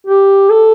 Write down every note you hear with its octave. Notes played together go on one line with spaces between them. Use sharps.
G4
A4